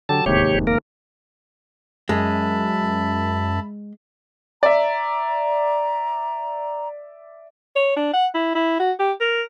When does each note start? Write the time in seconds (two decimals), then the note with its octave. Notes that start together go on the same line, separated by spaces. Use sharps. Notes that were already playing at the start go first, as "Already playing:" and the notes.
0.09 D3 F#3 G4 A4 A5
0.26 D1 D#2 G#2 C3 G4 C#5
0.54 F1
0.67 A#3 A#4
2.09 F#2 G#3 E5 A5 B5
4.63 D5 E5 A#5
7.76 C#5
7.97 D4
8.13 F#5
8.35 E4
8.55 E4
8.80 F#4
9.00 G4
9.20 A#4